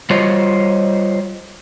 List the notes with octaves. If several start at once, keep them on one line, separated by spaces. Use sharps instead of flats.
G3 F4 C5 C#5 D#5